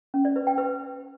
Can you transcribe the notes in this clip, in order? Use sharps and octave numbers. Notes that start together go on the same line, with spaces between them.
C#4
D5
B4
G5
B4